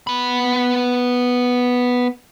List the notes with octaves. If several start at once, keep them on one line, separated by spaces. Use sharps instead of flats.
B3 B5